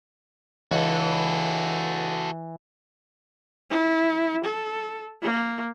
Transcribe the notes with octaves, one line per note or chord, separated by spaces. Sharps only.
C#2 E3 F#4 A4
E4
A4
A#3